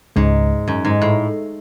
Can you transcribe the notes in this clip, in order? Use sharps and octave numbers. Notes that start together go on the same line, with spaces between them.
C#2 G#2 C#3 G#3
F#2
G#2
A2